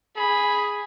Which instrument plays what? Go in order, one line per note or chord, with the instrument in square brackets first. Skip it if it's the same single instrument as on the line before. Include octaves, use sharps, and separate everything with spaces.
[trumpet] G#4 [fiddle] B5